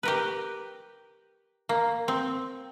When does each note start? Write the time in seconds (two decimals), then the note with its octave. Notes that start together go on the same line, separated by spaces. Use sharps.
0.03 G4 A#4 B4
1.69 A#3
2.08 C4